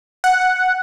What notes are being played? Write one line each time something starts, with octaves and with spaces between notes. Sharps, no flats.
F#5